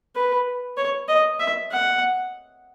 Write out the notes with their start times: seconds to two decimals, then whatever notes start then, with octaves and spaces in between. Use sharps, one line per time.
0.15 B4
0.77 C#5
1.09 D#5
1.40 E5
1.72 F#5